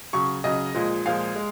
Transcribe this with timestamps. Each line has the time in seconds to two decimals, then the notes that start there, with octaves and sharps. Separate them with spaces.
0.13 C#3 F#3 C#6
0.44 C#3 F#3 D#5
0.75 A#2 F3 G#3
1.06 A#2 F3 G#3 F5
1.36 G#3